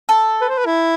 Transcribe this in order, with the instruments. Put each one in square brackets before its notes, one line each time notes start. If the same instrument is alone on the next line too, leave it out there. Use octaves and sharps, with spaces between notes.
[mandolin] A4
[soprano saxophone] B4
C5
B4
E4